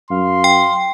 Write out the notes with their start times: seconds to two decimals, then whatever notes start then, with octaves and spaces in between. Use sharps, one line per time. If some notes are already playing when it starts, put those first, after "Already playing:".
0.11 F#2 F5 C6
0.44 G5